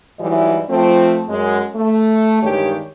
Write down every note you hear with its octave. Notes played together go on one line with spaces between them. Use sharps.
G#2 E3 F#3 G3 E4 D#5
F3 A3 C4
F#2 G#3
A3
E2 G2 D#3 G#3 G4 C#5